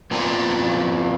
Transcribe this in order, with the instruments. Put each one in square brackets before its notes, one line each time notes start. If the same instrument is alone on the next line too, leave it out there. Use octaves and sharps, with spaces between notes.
[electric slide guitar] F2 A#3 B3 F4 D5 G#5